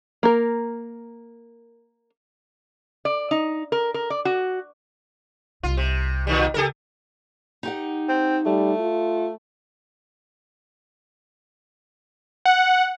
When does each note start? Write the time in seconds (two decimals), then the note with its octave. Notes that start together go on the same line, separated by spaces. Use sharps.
0.23 A#3 A#4
3.05 D5
3.31 D#4
3.72 A#4
3.94 A#4
4.10 D5
4.25 F#4
5.63 C2 F4
5.77 C3
6.27 A#2 D#3 G3
6.54 C#2 G4 A4 A#4
7.63 D#4 G4 F#5
8.09 C4
8.46 G3 A3
8.80 F4
12.45 F#5